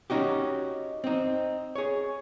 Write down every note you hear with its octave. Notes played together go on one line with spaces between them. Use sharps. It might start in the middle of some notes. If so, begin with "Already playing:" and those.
C#4 D#4 F#4 G4
C4 D#4
G#4 C#5